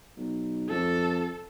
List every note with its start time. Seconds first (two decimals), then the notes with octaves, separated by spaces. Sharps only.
0.17 B1
0.69 F2 A4